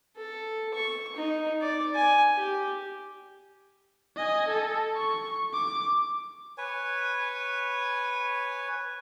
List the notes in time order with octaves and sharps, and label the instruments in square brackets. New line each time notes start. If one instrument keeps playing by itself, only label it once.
[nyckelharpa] A4
C#6
D#4
D5
G#5
G4
[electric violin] D#5 G#5
A4
C#6
D6
[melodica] B4 C#5 G#5